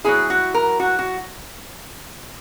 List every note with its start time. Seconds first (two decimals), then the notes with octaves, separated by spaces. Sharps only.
0.04 F#3 B3 E4 G#4
0.30 F#4
0.54 A#4
0.80 F#4
0.99 F#4